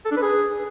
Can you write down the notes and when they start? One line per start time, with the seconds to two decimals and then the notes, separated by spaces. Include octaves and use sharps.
0.06 A4
0.11 D4
0.17 B4
0.22 G#4